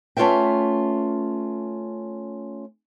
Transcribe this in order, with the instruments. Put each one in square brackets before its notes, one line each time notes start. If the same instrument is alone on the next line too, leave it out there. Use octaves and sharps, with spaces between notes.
[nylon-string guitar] A3 C#4 F4 B4 E5 G5